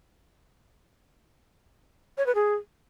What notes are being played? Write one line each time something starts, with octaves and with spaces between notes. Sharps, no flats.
C#5
B4
G#4